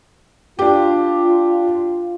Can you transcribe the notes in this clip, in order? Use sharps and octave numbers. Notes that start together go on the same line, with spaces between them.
D4 F4 G4